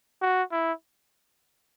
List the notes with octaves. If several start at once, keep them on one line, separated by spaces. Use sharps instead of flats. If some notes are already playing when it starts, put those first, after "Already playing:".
F#4
E4